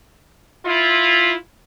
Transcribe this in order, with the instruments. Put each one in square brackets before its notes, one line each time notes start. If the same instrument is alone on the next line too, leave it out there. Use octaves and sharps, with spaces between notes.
[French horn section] E4 F4